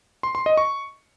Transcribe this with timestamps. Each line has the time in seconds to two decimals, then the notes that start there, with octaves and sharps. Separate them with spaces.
0.23 C6
0.35 C6
0.46 D#5
0.57 C#6